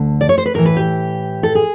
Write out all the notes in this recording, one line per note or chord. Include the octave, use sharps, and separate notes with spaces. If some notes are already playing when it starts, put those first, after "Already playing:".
Already playing: D2 D3
D5
C#5
C5
B4
A2 E3 A#4
B4
G4
A4
G#4